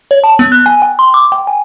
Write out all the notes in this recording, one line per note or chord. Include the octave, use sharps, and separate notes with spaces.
C#5
A5
B3
F#6
G#5
G5
C6
D6
G5
G#5